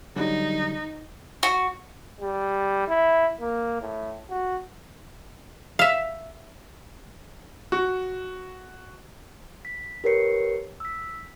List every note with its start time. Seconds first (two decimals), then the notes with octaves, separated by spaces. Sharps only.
0.16 D3 F#3 G3 D#4
1.43 F#4
2.21 G3
2.88 E4
3.41 A#3
3.81 A2
4.30 F#4
5.79 E5 F5
7.72 F#4
9.65 B6
10.04 G4 A#4 B4 C#5 C7 C#7
10.80 E6 B6